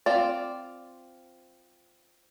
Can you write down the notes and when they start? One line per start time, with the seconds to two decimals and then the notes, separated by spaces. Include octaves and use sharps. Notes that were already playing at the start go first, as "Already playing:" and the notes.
0.06 C4 F4 D5